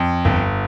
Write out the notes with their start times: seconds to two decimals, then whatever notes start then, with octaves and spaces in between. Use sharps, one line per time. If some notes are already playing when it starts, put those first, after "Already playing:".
Already playing: F2
0.25 G1